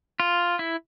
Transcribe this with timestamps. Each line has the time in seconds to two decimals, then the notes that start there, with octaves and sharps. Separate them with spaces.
0.20 F4
0.59 E4